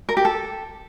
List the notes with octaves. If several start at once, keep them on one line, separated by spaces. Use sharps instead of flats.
A#4
G4
A4